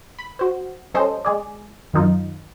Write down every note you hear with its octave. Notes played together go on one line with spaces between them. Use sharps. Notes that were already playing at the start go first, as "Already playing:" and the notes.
B5
F#4 C5
G3 C#4 A4 C5 D#5
G#3 G#4 D5
F#2 D#3 D#4 F4